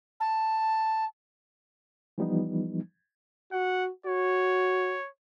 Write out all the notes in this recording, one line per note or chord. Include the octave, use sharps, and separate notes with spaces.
A5
E3 F3 G3 B3 D#4
F#4 F#5
F#4 C#5